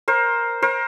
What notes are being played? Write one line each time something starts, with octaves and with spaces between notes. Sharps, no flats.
A#4 C5
A#4 C5